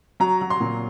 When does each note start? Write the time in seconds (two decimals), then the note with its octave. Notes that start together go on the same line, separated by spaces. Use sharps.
0.20 F#3 A#5
0.41 F#3
0.50 C6
0.61 A#2